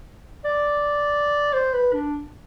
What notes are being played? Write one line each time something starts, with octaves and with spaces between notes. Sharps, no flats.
D5
C5
B4
D4